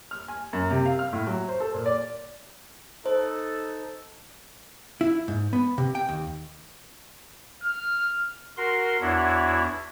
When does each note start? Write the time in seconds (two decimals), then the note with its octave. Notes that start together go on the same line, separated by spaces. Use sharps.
0.11 F6
0.28 G#5
0.53 F#2
0.70 C3
0.86 F5
0.99 F6
1.13 A2
1.27 F#3
1.48 C5
1.60 A4
1.74 A#2
1.86 D5
3.06 D#4 A4 C5
5.01 E4
5.28 G#2
5.53 B3
5.78 C3
5.95 G5
6.09 D#2
7.63 F6
8.57 F#4 A#4 C6
9.01 E2 D4 E4 F#4 C#5